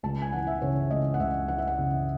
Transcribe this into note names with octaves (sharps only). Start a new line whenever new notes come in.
C#2 A5
G#5
E3 F#5
E5
C#3 C#5
C#2 D#5
F#5
C#2 E5
E3 F#5
E5
F#5
C#3